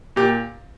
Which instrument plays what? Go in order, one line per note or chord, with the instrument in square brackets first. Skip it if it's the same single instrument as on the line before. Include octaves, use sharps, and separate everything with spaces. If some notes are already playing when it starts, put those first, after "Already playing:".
[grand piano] A#2 G4